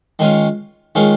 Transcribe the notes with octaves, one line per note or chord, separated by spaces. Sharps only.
D#3 G#3 C#4 F4
D#3 G#3 C#4 F4